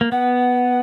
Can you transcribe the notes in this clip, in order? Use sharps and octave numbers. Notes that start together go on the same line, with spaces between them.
A#3
B3 F#5